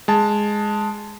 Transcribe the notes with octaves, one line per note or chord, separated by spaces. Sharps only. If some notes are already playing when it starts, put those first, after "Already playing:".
G#3 A5